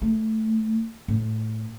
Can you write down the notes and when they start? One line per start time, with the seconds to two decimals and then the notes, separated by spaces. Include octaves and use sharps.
0.02 A3
1.08 A2